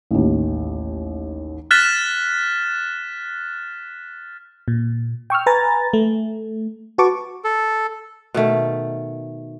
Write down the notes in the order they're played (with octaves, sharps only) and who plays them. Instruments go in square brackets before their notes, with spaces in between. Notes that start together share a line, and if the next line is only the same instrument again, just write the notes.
[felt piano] A1 D#2
[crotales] F6 F#6 A6 B6 E7
[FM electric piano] A#2
G5 C#6 E6 F6
B4 G#5 A#5 A6
A3
F#4 B4 A5 C#6 D6
[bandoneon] A4
[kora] B2 D#3 A3